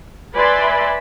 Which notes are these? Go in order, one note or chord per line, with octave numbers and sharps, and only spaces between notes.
B4 D5 E5 G#5 B5 C6